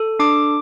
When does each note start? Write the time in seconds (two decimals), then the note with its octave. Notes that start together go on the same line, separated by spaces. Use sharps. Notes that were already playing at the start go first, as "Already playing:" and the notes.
Already playing: A4
0.19 D4 D6